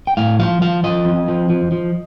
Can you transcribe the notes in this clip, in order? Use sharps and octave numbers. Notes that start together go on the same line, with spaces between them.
G5
A2 F5
F3 F5
F3 F5
F3 D#5
F2
F3
F3
F3